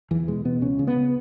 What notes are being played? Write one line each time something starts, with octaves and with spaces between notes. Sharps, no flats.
E2 E3
B2 G#3
B2 B3
C#2 C#4
C#3
B3
C#3